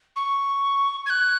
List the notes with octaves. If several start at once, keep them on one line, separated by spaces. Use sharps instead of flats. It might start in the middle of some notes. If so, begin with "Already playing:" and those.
C#6
G#6
F#6